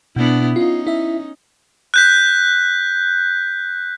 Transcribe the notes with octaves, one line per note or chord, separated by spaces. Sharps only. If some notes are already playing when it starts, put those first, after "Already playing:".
B2 B3 D4 E4
C#4 D#4 F4
E4 E5
F#6 G6 B6